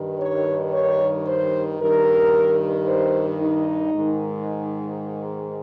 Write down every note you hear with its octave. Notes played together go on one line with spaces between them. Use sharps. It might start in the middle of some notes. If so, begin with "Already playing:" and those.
Already playing: G2 D#3
C#5
C#5
C5
G2 D#3 A#4
C5
D#4
G#2 D#3